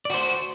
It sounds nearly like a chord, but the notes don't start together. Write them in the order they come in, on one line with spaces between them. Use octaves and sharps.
D5 F#4 C5